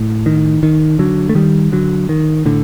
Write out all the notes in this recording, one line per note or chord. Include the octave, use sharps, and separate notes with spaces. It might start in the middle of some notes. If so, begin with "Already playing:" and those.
Already playing: A2
D#3
D#3
D3 F#3
A3
D#3 G3
D3 F#3
D#3
A2 D3